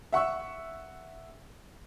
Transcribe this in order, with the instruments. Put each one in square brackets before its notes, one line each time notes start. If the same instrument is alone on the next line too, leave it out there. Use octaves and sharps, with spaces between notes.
[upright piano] E5 F#5 C#6 E6